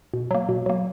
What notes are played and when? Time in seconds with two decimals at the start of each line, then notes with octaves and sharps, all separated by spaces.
0.14 B2
0.31 F#3 A#3
0.49 B2
0.66 F#3 A#3